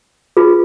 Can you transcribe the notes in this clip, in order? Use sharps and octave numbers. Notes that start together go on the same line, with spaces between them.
F4 G#4 B4